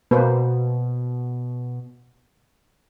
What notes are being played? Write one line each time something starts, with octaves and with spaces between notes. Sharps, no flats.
B2 A#3 B4 C5